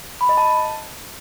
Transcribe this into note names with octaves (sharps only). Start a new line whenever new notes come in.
B5
D#5
A5